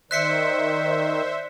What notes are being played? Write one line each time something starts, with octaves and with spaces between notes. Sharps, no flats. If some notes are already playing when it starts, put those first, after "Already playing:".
D#3 C5 D5 E5 F#6 B6 C#7